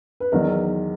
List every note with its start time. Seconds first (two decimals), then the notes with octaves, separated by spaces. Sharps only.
0.20 B4
0.32 E2 D#3 F#3 A#4